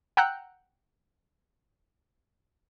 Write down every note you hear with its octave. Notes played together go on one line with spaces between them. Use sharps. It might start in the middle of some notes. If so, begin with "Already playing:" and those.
F#5 G5 A#5 E6 F#6 G6